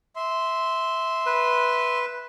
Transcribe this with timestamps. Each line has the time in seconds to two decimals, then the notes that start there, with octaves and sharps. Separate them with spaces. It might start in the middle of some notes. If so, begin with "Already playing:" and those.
0.16 E5 C6
1.26 B4